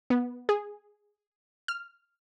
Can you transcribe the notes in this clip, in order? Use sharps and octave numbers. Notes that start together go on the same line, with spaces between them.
B3
G#4
F6